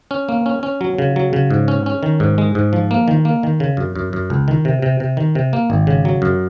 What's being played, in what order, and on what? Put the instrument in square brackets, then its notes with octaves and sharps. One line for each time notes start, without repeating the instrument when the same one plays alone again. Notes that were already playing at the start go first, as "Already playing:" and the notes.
[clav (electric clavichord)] C#4
A#3
C#4
C#4
F#3
C#3
F#3
C#3
G#2
C#4
C#4
D#3
G#2
G#3
G#2
F3
A#3
D#3
A#3
D#3
C#3
F#2
F#2
F#2
C#2
D#3
C3
C3
C3
D#3
C3
A#3
G#1
C#3
F#3
F#2